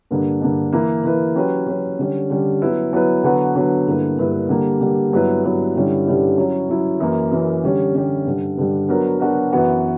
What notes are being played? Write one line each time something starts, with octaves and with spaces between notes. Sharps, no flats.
G2 D3 A#3 D4
G2 D3 A#3 D4
E3 A#3 E4 B4
E3 A#3 E4 B4
F#3 C#4 G4 B4
F#3 C#4 G4 B4
D3 G3 C#4
D3 G3 C#4
F#3 B3 E4 B4
F#3 B3 E4 B4
D3 F#3 B3 F#4 B4
D3 F#3 B3 F#4 B4
G2 D3 A#3 E4 B4
G2 D3 A#3 E4 B4
D3 G3 A#3
D3 G3 A#3
G2 F#3 B3 E4 B4
G2 F#3 B3 E4 B4
G2 D3 G3 C#4 E4
G2 D3 G3 C#4 E4
F#3 C#4 E4
F#3 C#4 E4
F#2 E3 A#3
F#2 E3 A#3
D3 G3 C#4 G4
D3 G3 C#4 G4
G2 D3 G3
G2 D3 G3
F#3 B3 D4 F#4 A#4
F#3 B3 D4 F#4 A#4
F#2 E3 B3 F#4